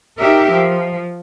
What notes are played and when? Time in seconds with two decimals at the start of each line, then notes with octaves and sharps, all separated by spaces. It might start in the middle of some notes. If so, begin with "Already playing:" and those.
0.19 D#4 G4 A#4 E5
0.50 F3